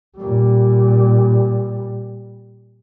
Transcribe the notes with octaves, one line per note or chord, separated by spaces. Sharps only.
A#2 G3